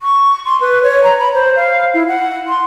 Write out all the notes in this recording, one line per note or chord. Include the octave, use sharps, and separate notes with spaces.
C#6
C6
B4
C#5
A#5
B5
C5
F5
E4
F#5
C6